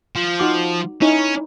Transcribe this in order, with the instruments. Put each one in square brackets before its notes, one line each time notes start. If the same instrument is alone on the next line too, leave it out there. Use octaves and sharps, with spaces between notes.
[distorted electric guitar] F3
[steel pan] D#4 F#4 D6
[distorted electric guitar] C#4 [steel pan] D#4 E4 C#5